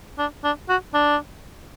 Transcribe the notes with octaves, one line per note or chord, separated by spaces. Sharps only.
D4
D4
F#4
D4